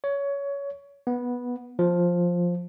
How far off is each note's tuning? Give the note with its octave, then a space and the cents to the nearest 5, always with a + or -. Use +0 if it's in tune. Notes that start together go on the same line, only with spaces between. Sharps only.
C#5 +20
B3 -10
F3 +5